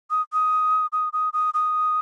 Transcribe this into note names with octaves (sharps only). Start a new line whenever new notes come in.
D#6
D#6
D#6
D#6
D#6
D#6